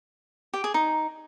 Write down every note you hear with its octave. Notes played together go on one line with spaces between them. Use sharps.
G4
G#4
D#4